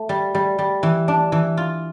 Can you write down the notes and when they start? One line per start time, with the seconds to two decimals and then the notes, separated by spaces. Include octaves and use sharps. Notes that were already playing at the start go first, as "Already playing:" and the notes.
Already playing: A3
0.09 G3
0.35 G3
0.59 G3
0.83 E3
1.08 D4
1.32 E3
1.57 F4